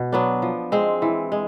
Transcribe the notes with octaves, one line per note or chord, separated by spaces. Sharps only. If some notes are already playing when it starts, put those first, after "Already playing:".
Already playing: B2
F#3 B3 D4
F3
G#3 C4
E3
G#3